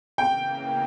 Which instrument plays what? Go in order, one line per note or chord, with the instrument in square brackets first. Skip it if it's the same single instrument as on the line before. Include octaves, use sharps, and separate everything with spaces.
[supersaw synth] C#3 E3 A#3 [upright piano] G5